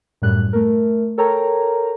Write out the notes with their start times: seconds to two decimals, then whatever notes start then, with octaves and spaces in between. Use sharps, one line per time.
0.22 F#2 A2 G3 F#6
0.53 A3 A#4
1.18 A4 A#4 C#5 G5 A#5